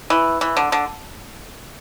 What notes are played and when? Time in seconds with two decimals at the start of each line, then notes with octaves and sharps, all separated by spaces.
0.10 E3
0.41 E3
0.57 D3
0.72 D3